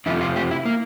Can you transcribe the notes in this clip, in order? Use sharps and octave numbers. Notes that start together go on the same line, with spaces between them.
F2 C3 F3 A3 E4
F4
G4
E4
A#3